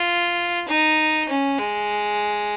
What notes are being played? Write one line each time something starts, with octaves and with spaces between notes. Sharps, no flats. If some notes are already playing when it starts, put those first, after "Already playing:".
Already playing: F4
D#4
C#4
G#3